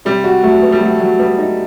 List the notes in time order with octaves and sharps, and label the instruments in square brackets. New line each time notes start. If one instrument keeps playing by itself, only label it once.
[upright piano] C3 [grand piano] G3
[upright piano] F#4
[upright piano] F#3 [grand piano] A3
[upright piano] B3
[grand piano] G3
[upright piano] F#3 [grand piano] A3
[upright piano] F#3
[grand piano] G3 [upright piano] B3
[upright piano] D#4